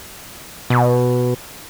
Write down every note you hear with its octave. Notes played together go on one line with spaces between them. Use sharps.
B2